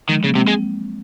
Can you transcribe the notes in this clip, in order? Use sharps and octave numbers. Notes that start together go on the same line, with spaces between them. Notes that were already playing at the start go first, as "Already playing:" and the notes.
D#3 F3 G#3
C#3 F#3 A#3
C3 G#3 C4
G#3